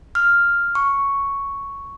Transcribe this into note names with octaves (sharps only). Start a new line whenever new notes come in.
F6
C#6